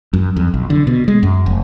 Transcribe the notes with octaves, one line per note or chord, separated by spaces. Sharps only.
F#2
F2
B1
D3
B2
G#3
F#2
F1